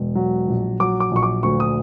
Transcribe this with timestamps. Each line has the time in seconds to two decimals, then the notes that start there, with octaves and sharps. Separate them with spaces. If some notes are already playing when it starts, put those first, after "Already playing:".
Already playing: E1
0.15 F#3
0.48 A#1
0.80 F#3 D6
1.00 D6
1.11 A#1 C#6
1.23 D6
1.43 D2 C#6
1.60 D#6